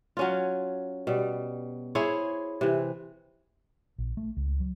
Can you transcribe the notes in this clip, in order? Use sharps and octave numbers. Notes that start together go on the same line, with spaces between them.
F#3 C#4 F4
B2 G3
E4 G#4 C5 C#5
C3 E3
A#1
A3
C#2
F#3